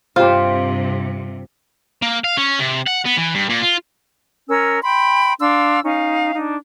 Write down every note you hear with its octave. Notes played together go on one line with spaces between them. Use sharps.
G2 C3 F4 G4 C5
A#3
F5
C#4
C3
F#5
B3
E3
G2
A#2
F4
C#4 A#4 E6
G5 B5 C6
D4 F5 C6 E6
C#4 D#4 F5
D4 D#4